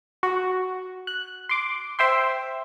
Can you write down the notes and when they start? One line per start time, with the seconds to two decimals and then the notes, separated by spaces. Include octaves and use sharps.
0.23 F#4
1.07 F#6
1.49 C6 D6
1.99 C5 E5 G5 C6